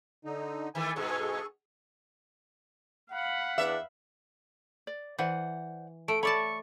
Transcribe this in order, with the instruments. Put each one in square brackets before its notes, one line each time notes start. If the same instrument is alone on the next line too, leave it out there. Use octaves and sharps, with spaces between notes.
[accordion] D3 D#4
[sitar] D#3 E3 A3 [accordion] G#5
[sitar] G2 B2 G#3 [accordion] G#4 A4 C#6
[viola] F5 B5 [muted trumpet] F#5
[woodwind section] E2 D4 [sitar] E5
[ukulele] D5
[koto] E3 [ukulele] C5 D5 F#5
[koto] A3 [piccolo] D7
[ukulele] A4 B5 [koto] C#5 D5 A5 [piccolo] C#6